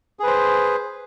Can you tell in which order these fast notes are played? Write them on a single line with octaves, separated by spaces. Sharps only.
G#4 B4 C5